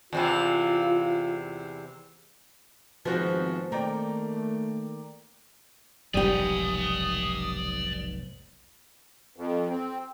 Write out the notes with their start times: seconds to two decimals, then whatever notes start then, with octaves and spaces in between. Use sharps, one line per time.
0.13 E2 C3 E3 F4
3.05 G#1 F3 G#3 B3 C4 F#4 G#4
3.72 D#3 A3 A#3 D5 G5 A#5
6.14 F1 B1 G#2 G3 G4 D5 G#5 D#6
9.36 F2
9.70 C4